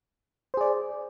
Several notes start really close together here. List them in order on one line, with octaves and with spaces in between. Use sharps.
C5 G#4 D5